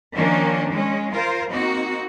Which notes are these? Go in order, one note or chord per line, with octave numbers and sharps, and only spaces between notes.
D#3 F3 A#3 C#4 D4
G#3 C#4
F4 A#4 C5
A#3 C4 D#4 F#4